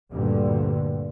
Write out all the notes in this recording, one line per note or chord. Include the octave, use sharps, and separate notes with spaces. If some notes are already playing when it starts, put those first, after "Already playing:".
D2 G2 A#2 D3